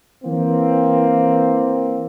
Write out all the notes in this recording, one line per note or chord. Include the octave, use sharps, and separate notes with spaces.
E3 A#3 C4